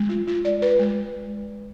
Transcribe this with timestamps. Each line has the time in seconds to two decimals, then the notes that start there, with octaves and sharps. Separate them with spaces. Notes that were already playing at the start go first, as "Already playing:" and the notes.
Already playing: G#3
0.09 F4
0.27 F4
0.45 D5
0.62 B4
0.79 G#3